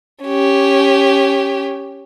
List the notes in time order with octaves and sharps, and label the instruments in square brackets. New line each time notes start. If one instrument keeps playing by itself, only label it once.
[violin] C#4 G4